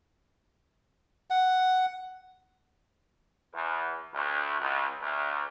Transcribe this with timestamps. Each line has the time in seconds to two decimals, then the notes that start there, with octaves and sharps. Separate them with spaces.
1.30 F#5
3.54 E2
4.15 D2
4.60 C#2
5.02 D2